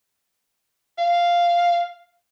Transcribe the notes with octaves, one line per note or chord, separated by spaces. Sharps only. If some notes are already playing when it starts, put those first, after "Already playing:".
F5